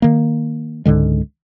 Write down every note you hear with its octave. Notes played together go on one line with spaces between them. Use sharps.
D#3 A#3
C#2 G#2 D3 G#3